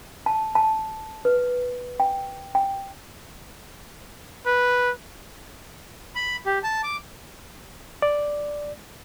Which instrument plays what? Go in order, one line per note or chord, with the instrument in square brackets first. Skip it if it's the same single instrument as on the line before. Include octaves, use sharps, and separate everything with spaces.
[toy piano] A5
A5
B4
G5
G5
[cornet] B4
[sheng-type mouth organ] B5
G4
A5
D6
[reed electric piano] D5